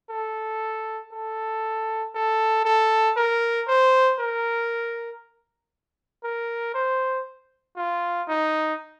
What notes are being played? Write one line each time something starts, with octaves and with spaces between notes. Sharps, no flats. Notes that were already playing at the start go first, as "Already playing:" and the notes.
A4
A4
A4
A4
A#4
C5
A#4
A#4
C5
F4
D#4